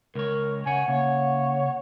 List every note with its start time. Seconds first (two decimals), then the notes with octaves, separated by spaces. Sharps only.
0.15 C#2 A#4 C#5
0.66 C#3 C#5 F#5 G#5
0.88 C#3 A#3 C#5